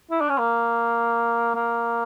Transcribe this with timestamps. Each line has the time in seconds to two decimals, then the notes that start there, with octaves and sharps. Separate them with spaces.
0.11 E4
0.21 D4
0.29 C#4
0.38 A#3
1.55 A#3